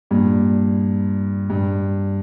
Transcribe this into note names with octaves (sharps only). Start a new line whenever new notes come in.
G2 A#2
G2